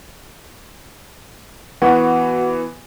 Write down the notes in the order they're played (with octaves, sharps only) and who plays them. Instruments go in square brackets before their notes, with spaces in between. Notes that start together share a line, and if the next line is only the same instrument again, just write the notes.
[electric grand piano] E3 B3 [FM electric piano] F#4